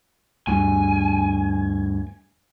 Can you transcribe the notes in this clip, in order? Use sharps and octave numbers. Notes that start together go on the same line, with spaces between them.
D2 G2 D3 G#5